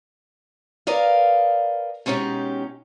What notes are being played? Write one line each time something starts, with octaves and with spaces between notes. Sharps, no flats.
A#4 B4 D5 D#5 F5
B2 G#3 C#4 D#4 G4